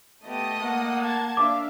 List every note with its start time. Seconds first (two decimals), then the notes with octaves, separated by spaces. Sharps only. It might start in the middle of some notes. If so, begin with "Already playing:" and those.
0.24 A3 B3 G4 D#5 D#6
0.60 A#3 F#5
1.01 A5 G#6
1.37 D4 E5 F5 D6